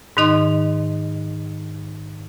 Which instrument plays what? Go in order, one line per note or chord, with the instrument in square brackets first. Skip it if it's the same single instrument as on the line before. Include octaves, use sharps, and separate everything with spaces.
[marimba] G#2 D#3 D#4 D#5 C6